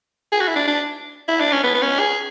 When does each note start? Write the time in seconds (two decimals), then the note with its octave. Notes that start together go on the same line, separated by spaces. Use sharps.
0.32 G#4
0.40 F#4
0.48 E4
0.56 D4
0.68 D4
1.28 E4
1.40 D4
1.52 C#4
1.63 B3
1.74 B3
1.82 C#4
1.99 G#4